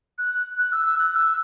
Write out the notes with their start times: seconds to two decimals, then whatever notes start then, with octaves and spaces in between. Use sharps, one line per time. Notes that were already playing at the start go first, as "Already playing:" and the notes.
0.18 F#6
0.59 F#6
0.72 E6
0.86 E6
0.98 F#6
1.16 E6